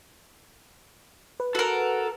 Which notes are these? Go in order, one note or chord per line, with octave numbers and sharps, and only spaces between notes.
B4
F#4 A4 A#4